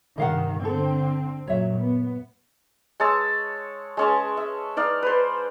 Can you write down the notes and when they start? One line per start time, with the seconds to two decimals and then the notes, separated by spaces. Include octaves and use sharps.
0.18 G2 C3 D#3 D#5 F5 F#5
0.65 D3 C4 A4
1.47 F#2 A#2 F#3 C#5 E5
1.79 B3
3.00 G#3 C#5 A5 E6
3.97 G#3 C#4 A5
4.37 E5
4.77 D#4 D5 F5
5.02 B4 C5